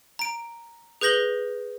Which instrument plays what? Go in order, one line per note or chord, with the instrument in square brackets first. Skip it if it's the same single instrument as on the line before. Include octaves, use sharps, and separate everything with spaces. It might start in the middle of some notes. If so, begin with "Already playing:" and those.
[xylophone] A#5 D7
G#4 B4 G6 A#6 F#7 G7